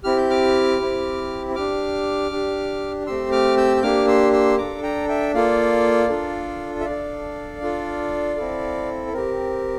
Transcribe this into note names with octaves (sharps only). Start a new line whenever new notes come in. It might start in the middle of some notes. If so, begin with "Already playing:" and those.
C4 E4 G4 F6
G6
D6 F6
C4 E4 G4
D4 G4 D6 F6
D4 G4
A3 C4 G4 C6 E6
D6 F6
E6 G6
G6
A#3 D4 G4 D6 F6
C6 E6
C6 E6
D4 A4 A#5 D6
G5 A#5
E5 G5
A#3 F4 A4 D5 F5
D4 F4 A4
E5
D4 A4 D5 F5
D4 F4 A4
C4 E4 A4
C4 G4 A#4